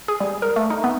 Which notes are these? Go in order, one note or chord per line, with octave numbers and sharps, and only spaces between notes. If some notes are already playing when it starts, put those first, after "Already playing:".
G#4
G3
A#4
A3
D#4
B3